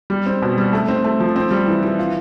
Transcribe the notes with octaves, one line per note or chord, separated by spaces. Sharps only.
G3
C4
B2
G3
A3
C4
A3
F3
C4
G3
E3
E3
F4